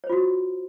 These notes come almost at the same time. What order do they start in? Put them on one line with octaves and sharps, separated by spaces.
C#5 C5 F4 F#4